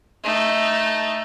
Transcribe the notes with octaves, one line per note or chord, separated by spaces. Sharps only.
A3 D#4